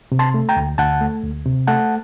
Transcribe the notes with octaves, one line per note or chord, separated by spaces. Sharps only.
C3
A5 C6
A3
G5 A#5
D2
D2 F#5 A5
A3
D2
C3
A3 F#5 A5